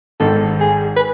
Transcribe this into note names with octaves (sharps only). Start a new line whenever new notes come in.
G#1 G#2 D#3 A4
G#4
B4